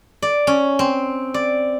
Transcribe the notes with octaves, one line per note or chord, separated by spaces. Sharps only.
D5
C#4
C4
D5